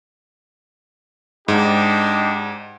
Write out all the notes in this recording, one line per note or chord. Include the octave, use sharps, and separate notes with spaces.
G#2 D4 D#4 G4